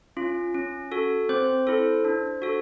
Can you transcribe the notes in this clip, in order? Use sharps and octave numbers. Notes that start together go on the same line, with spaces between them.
C#4 F4
C#4
F#4 A4
C4 C5
E4 A4
D4
F#4 A4